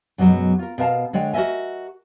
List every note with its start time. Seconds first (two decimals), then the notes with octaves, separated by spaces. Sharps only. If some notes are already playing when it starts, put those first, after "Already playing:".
0.18 F#2 B2 F3 F#3 G#3
0.59 F4 A#4
0.78 B2 F#4 A#4 F5 A5
1.13 D3 G#3 C#5 D5 G5
1.33 F#4 A#4 C#5 D#5 E5 G#5